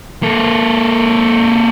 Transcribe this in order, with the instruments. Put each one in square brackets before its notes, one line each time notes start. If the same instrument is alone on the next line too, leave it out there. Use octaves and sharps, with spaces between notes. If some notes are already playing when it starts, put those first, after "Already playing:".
[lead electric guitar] A#3 A4